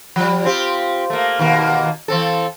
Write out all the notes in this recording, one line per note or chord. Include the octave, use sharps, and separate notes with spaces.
F3 G3
C4 F4 G4
A3 A#3
D#2 B2 A#3
E3 C4 A4